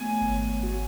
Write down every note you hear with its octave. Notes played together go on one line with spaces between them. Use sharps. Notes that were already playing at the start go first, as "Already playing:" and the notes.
Already playing: A3 B3 G#5
G#1
F#4